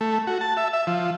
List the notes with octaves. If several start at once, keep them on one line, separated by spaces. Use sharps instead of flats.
A3
F#4
A5
E5
E5
F3